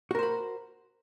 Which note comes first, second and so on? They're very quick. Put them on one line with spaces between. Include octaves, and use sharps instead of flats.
F#4 A#4 C5 B5